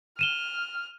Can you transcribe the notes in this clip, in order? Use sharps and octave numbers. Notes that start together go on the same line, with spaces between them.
F6 D#7 E7 G7